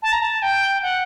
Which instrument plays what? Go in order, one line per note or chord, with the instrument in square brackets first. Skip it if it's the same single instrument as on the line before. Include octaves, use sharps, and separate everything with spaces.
[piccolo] A5
A#5
A5
G5
F#5